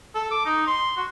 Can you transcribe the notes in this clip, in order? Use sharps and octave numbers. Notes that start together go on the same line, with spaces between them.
A4
D6
D#4
C6
F#4